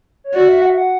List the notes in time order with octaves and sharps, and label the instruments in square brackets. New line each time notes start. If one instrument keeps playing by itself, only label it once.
[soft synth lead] C#5
[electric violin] F#4 [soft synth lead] D5
[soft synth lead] E5
F#5
E5
F#5